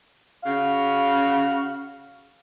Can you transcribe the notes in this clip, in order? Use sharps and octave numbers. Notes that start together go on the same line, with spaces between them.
C#3 F#4 F5